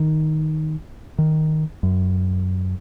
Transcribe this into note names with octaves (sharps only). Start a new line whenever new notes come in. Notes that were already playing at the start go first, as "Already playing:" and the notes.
Already playing: D#3
D#3
F#2